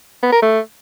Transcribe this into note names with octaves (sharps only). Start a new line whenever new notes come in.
B3
A#4
A3